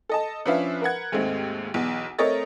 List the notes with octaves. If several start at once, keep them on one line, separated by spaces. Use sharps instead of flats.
A4 D#5 A5
F3 C#4 D4 B4 E5 F5
A#4 B4 F#5 G#6
D#2 G#2 A3 C4
B1 E2
A3 C4 A#4 C#5 D#5 A6